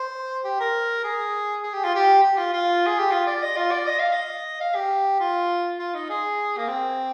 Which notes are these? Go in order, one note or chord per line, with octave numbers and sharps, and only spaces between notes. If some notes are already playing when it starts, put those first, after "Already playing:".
Already playing: C5
G4
A#4
G#4
G#4
G4
F4
G4
G4
F4
F4
G#4
G4
F4
D5
D#5
F4
D5
D#5
F5
D#5
F5
G4
F4
F4
D#4
G#4
A#3
C4